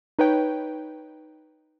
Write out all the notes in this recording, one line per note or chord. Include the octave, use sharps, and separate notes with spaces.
D#4 B4 C#5 G5